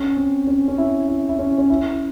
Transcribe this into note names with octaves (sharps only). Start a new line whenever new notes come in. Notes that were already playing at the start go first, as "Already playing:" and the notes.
Already playing: C#4
C4
C#4
C#4
E4
E4
E4
C#4
C#4
E4